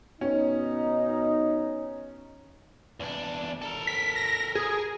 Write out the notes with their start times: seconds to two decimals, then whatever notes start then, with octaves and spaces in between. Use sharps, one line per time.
0.21 B2 C#4 D#4
3.00 E2 D4
3.62 A4 A#4
3.87 B6
4.16 A#6
4.55 G#4